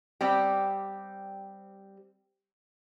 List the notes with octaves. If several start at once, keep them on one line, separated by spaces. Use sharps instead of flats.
G3 C4 G4